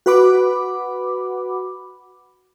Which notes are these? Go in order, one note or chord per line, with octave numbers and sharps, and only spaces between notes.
F#4 B4 F#5 B5 D6